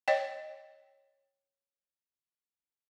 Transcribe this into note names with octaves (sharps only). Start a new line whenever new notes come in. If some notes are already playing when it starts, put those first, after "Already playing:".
C#5 D#5 G5